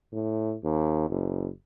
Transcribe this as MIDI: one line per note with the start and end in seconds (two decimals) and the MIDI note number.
0.13 0.55 45
0.64 1.05 39
1.10 1.48 30